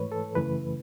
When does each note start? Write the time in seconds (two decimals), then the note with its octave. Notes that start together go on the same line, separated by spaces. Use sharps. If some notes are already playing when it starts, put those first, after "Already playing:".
Already playing: G#2 E3 A3 B4 C#5
0.12 A4
0.36 F#2 C#3 E3 A3 B4